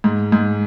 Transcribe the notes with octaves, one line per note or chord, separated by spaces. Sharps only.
G#2
G#2